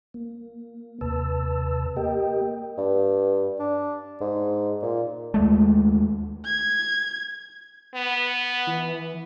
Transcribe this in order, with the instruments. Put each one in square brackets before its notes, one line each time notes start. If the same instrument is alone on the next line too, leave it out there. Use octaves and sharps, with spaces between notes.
[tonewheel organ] A#3
D#2 C3 B4 A5 E6
A#3 G4 A#4 D#5 G5
[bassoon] G2
D4
G#2
A#2
[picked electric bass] D#2 G#3 A3
[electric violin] G#6
[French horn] B3
[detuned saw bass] E3